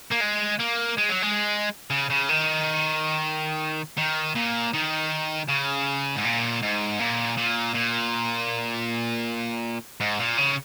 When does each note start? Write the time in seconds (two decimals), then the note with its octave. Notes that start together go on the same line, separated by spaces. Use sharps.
0.12 A#3
0.21 G#3
0.59 A#3
0.97 G#3
1.09 F#3
1.22 G#3
1.91 C#3
2.10 C#3
2.29 D#3
3.98 D#3
4.36 A#2
4.74 D#3
5.48 C#3
6.16 G#2
6.24 A#2
6.62 G#2
6.99 A#2
7.37 A#2
7.74 A#2
10.00 G#2
10.20 A#2
10.37 C#3